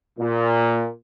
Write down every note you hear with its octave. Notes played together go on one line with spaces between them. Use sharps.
A#2